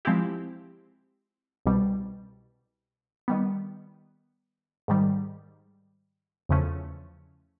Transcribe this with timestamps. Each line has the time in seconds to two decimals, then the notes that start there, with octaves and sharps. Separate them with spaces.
0.05 F3 G#3 C4 E4 G4
1.66 C2 B2 G3
3.28 D#3 G3 B3
4.88 G#2 D#3 G3
6.49 E2 C#3 F3 A3 C#4